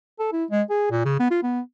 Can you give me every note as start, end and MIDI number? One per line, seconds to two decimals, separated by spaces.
0.19 0.28 69
0.32 0.44 64
0.51 0.62 56
0.70 0.89 68
0.91 1.04 46
1.05 1.19 49
1.20 1.31 59
1.31 1.39 65
1.43 1.61 59